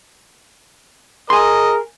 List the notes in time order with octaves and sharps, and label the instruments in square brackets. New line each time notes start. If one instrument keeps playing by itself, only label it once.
[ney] G#4 [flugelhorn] A#4 [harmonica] D#5 [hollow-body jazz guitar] G#5 C6